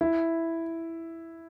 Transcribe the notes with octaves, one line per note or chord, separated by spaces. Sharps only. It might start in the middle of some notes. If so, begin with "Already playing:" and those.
E4